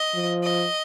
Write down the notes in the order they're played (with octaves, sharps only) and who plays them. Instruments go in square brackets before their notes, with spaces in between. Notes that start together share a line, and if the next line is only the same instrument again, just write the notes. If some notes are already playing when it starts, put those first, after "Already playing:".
Already playing: [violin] D#5
[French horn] F3
[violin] D#5